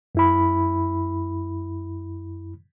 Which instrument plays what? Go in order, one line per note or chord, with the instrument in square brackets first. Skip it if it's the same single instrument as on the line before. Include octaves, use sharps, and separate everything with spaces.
[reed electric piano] F#2 E4 B5